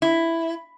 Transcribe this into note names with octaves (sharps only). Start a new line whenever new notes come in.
E4